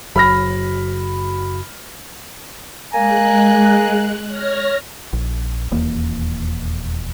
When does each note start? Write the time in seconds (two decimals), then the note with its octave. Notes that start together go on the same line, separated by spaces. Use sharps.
0.16 F#1 F#3 B5 F6 A#6
2.93 G#3 A#3 G#5 A#5 F#6
4.27 C#5 F6 A#6
5.13 A#1
5.71 D#1 E2 A#3